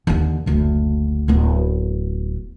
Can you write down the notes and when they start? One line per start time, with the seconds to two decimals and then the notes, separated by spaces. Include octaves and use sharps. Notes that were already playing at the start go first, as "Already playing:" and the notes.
0.07 D#2 D3
0.46 F#1 D2
1.28 D1 B3